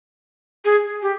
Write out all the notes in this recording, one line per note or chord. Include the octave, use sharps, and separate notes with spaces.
G#4
G4